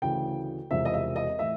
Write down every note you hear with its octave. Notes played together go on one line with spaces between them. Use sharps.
D2 C#3 E3 G5
E1 E2 C3 F3 E5
D#5
E5
D#5
A2 E3 E5